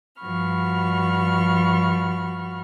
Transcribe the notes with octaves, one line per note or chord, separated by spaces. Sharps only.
G2 F3 F#4 B5 C#6 F6